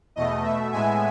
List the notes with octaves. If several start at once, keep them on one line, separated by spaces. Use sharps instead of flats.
E2 B2 A3 D#5
B2 A3 E5
A2 G#3 B3 E5 G#5